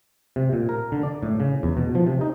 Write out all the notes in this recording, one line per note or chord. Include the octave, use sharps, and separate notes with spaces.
C3
A#2
A#4
D3
D5
A2
C#3
E2
B2
F3
C3
D#4